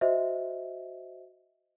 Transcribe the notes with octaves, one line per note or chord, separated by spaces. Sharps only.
F#4 C5 D#5 E5